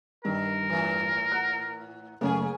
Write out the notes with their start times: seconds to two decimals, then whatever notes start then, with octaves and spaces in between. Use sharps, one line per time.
0.25 G2 D#3 A#4
0.69 A2 E3
1.32 F#5 A#5 F#6
2.21 F#1 C#3 A3 A#3 C#4 G#4